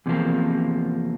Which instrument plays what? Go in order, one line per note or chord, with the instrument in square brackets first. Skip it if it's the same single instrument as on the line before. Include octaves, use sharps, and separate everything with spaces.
[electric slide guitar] E2 C3 F3 A#3